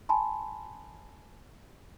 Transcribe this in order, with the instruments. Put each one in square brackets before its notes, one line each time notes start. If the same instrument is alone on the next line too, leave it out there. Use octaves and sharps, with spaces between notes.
[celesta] G#5 A5 B5 C6